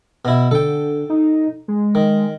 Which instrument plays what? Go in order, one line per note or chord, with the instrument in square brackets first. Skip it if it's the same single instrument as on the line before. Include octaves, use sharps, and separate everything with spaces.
[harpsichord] B2 E4
[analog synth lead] D3 [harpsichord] A4 G5
[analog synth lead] D#4
G#3
[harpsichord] D#3